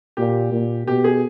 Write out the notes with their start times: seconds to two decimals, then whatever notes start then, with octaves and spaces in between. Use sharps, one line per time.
0.17 A#2 G4
0.53 A#2
0.87 B2 G4
1.04 G#4